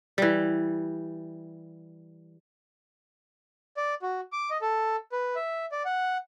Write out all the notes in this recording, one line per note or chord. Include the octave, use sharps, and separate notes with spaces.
E3 G3
D5
F#4
D6
D#5
A4
B4
E5
D5
F#5